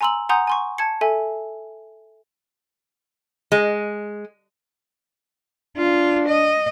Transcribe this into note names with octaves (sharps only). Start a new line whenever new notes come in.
G#5 A#5 C6 E6 F#7
F#5 G#5 A#5 C6 D#6 G6
G#5 C6 C#6
A5 G#6 C#7
A4 E5 G#5
G#3
D4 F4
D#5